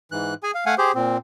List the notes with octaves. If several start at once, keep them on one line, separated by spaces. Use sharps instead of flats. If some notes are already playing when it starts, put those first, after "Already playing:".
G#2 E3 F#6
G#4 G#5
F5
A3 F5 F#5 G#5
G4 G#4 C5
A#2 C4